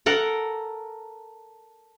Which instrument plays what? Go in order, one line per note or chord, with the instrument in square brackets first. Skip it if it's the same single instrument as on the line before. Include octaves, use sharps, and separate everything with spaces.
[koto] A4 A#4 F#5